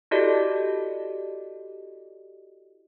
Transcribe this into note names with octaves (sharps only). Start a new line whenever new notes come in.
E4 F#4 G4 A4 D5 D#5